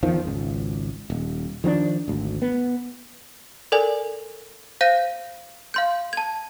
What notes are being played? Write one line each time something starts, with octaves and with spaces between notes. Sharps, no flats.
E2 D#3 F3
G#1 C#2
D#1
D#3 F3 B3 D4
G#1 D2
B3
A4 A#4 D5 G#5
C5 F5 G6 A#6 D#7
F5 C6 G6
A5 G#6